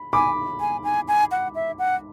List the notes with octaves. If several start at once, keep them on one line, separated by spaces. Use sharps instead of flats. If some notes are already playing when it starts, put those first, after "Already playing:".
Already playing: B5
G#5 B5 D6
G#5
G#5
G#5
F#5
E5
F#5